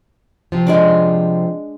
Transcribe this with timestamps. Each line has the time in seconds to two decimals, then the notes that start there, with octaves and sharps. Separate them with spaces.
0.52 C3 F3
0.67 G#3 D4 D5